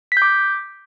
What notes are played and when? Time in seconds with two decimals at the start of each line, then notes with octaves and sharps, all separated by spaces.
0.12 B6
0.17 G6
0.22 D6